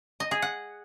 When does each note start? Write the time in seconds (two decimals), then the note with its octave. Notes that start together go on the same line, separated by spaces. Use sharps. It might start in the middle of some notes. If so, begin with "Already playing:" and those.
0.20 D#5
0.31 G#4
0.42 F#5